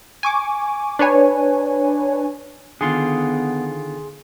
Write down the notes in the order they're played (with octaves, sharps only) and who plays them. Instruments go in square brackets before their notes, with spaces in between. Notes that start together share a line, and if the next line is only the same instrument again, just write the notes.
[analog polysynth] G#5 C#6 D6
D4 B4 C#5 G#5
[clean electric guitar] D3 D#3 F4 [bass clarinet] B3 [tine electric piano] G#4 C6